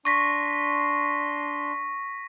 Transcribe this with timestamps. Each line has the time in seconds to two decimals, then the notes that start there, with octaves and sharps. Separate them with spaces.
0.05 D4 C6 C#6 A#6 B6